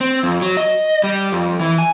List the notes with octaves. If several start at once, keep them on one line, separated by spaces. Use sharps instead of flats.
C4
F2
F#3
D#5
G3
F2
E3
G#5